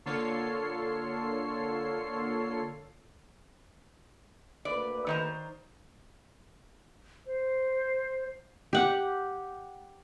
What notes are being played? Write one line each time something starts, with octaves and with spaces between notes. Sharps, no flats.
D3 A#3 F4 A4 C#5 C7
D2 A#3 B4 D5
D#3 C5 A#5
C5
G4 F#5